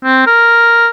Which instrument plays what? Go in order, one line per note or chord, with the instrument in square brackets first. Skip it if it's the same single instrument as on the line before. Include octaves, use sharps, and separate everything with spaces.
[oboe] C4
A#4